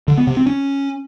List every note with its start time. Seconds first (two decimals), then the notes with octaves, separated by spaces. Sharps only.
0.08 D3
0.17 B3
0.27 C3
0.37 C4
0.47 C#4